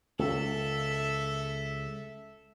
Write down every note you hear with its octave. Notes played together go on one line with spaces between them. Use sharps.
C#2 A4 E5